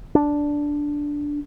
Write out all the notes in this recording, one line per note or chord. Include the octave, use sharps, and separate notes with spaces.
D4